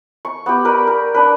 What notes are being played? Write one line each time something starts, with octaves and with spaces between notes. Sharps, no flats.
C#6
B3 G4
A#4 B4 D5 B5
A#4
D4 B4